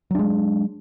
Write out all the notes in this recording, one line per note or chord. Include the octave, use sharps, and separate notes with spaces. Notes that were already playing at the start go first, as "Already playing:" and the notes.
F#3 G#3 D4